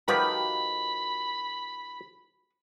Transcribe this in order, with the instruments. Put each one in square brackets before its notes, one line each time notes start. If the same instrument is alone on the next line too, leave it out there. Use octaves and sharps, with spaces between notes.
[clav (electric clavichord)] D#3 F3 G4 [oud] F#4 B4 [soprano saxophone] B5